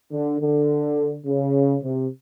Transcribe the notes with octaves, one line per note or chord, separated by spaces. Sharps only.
D3
D3
C#3
C3